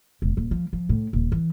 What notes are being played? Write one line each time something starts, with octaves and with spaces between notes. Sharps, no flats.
E1
D#1
F3
F3
A2
D#1
E3